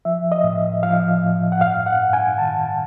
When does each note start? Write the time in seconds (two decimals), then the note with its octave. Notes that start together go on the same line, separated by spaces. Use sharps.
0.05 F3 E5
0.32 D#5
0.43 A2
0.83 F3 F5
1.22 A2
1.52 F#5
1.61 G2 F5
1.86 F#5
2.00 G2
2.13 G#5
2.38 D#3 A5